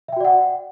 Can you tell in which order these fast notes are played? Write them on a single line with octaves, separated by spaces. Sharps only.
E5 G5 F#4 D5 F#5